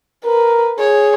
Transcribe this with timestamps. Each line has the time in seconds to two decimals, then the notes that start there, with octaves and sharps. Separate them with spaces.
0.25 A#4 B4
0.79 G#4 C#5